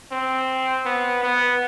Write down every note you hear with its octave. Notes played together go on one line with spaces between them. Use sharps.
C4
B3
B3